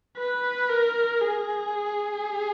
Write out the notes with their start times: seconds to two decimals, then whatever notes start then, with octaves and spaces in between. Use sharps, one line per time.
0.17 B4
0.70 A#4
1.22 G#4